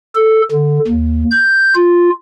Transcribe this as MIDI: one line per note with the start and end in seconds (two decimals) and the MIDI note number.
0.15 0.41 69
0.52 0.79 50
0.88 1.24 39
1.31 1.74 91
1.76 2.10 65